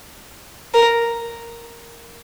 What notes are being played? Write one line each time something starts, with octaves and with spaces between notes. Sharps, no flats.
A#4